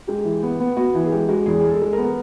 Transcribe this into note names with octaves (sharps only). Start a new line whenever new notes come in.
G#3 G4
E3
B3
B3
B3 F#4
E3
G#4
G#3 G4
G#3 F#4
E2 G#4
G#3 G#4
A4
G#3
A#4
B3